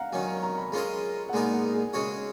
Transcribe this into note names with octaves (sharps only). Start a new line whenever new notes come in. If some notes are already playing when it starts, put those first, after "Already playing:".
Already playing: F5 F#5 A#5
D#3 F#3 C#4 G#5
A#5
A#5
B5
G#3 C#4 F4 A#4 D#5 A#5
F#5
A#2 G#3 B3 D#4 A#4 G#5
F#5
G#4
C#3 G#3 C#4 F#4 C#5